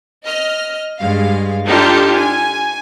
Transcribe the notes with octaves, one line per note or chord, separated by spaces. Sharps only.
D#5 F6
G2 G#3 F5
D4 D#4 F4 G4 A4
G#5